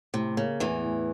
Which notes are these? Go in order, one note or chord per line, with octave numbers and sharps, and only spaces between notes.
A2 C3
C#3 A#3
E2 A2 E3
A2